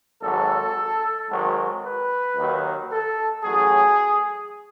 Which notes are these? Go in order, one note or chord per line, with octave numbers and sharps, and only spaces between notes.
G#1 G#2 F#3 A4
G#1 G#2 D#3 F#3
B4
D#2 D#3 F#3
A4
A1 A2 F#3 G#4